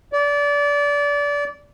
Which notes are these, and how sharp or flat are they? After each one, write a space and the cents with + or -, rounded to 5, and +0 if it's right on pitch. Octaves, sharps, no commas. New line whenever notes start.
D5 -25